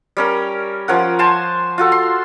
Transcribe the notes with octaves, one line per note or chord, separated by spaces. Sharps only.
G3 C#4 A#4
F3 C#4 A#4 F#5
C5 G#5 A5 C6
F4 F#4 A4
C6